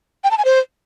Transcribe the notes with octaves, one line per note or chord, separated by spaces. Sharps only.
G5
A5
G#5
C5